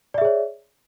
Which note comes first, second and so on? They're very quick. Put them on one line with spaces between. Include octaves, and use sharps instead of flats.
D5 E5 G#4 C#5